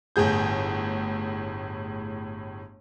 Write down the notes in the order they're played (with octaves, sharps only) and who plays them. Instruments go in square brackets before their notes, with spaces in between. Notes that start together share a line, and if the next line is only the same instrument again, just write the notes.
[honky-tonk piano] G1 A2 G#4 G6